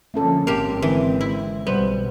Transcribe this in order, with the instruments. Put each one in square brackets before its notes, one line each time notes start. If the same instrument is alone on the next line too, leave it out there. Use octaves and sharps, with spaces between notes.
[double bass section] D3 F3 A#3 [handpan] A3 C#4 A4
[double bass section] G#1 G#3 C4 [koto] A#3 G4
[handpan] D3 [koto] E3
[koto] E4
[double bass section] B1 B2 [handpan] G3 C5 [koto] B3